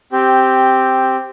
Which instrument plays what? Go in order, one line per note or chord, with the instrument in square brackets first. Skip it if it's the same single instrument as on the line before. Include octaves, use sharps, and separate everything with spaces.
[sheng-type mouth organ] C4 G4